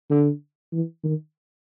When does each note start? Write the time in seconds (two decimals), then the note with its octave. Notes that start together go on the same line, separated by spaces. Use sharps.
0.10 D3
0.72 E3
1.04 D#3